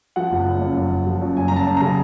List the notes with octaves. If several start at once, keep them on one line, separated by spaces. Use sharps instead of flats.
F3 F#5
F#1
F#1
F#2
F#1
F#1
F3
F#2
F#1 G#5
A#5
F#2 A5
F#2
C#3 A#5